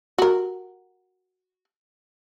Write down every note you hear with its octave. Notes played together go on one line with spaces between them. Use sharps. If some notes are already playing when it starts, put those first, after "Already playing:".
F#4 A#4